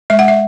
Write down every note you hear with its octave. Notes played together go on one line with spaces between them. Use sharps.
G#3 E5
F#5
E5